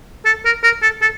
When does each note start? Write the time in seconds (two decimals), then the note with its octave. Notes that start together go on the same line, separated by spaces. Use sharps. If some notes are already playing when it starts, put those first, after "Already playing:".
0.26 A4
0.45 A#4
0.64 A#4
0.82 A4
1.02 A4